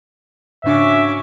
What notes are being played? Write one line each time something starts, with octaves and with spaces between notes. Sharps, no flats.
G#2 C#3 C#4 D4 F#4 E5 D6